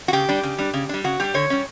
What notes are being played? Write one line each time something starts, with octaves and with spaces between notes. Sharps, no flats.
F#4
C#3 G4
G3 D4
C#3
G3 D4
C#3
G3 D4
C#3 F#4
G3 D4 G4
D3 C#5
G3 C#4